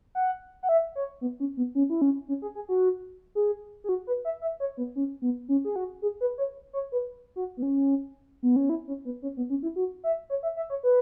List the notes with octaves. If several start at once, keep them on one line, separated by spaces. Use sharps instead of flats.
F#5
F#5
E5
C#5
B3
C#4
B3
C#4
E4
C#4
C#4
G#4
G#4
F#4
G#4
G#4
F#4
B4
E5
E5
C#5
B3
C#4
B3
C#4
G#4
F#4
G#4
B4
C#5
C#5
B4
F#4
B3
C#4
B3
C#4
E4
C#4
B3
C#4
B3
C#4
E4
F#4
E5
C#5
E5
E5
C#5
B4